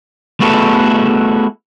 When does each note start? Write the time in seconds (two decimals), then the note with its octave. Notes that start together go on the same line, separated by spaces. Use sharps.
0.40 A3 B3 E4 F#4 G#4 A4